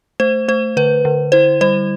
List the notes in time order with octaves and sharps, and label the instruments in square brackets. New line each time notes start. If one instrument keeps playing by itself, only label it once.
[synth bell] A3 C5
A3 C5
D3 B4
D3
E4 C5
G3 C5